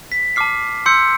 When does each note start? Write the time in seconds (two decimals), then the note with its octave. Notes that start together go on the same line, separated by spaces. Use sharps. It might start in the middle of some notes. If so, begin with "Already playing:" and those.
0.12 B6
0.36 A5 D6 F6 C7
0.86 C6 E6 G6 C#7